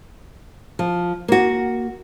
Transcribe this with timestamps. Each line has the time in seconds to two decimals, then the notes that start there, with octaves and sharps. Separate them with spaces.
0.79 F3
1.28 A#3 F#4